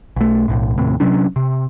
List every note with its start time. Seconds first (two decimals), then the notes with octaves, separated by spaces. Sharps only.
0.16 B1 A3
0.48 B1 A2
0.78 D#2 A2 C3
1.00 C3 F#3 C#4 D4
1.36 C3